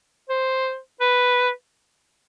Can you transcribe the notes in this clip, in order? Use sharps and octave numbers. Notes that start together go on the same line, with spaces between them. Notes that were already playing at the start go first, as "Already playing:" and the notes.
C5
B4